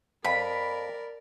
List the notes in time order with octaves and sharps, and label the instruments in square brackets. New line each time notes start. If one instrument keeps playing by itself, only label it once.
[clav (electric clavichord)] F2 [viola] A#4 D5 [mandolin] B5